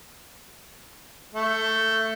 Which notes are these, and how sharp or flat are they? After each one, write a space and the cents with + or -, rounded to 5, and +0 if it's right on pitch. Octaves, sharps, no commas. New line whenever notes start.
A3 +15